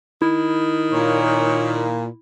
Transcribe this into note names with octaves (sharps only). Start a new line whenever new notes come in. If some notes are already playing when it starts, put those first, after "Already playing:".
D#3 E4
A#2 C#5